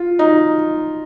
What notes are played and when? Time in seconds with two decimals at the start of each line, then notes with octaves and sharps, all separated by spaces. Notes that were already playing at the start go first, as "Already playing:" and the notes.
Already playing: F4
0.19 D#4